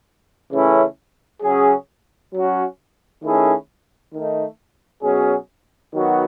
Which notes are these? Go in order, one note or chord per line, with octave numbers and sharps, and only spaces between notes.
C#3 E3 A3 C#4 E4
C#3 F#3 C#4 G#4
F#3 C#4 F#4
D#3 A3 C#4 E4 G#4
D#3 A3 D#4
B2 F#3 C#4 G#4
D#3 F#3 B3 F#4